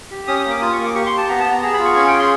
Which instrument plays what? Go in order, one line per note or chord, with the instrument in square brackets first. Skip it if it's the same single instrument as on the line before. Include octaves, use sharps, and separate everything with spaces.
[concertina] G4
C#4 D#6
D#6
A#3
D6
F4 D#6
C#6
A#3 D6
G4 C#6
C6
G4
A5
B3 A#5
A5
B3
A#5
G#4 A#5
B5
F4
C#6
C#4 C#6
G5
G#4
C6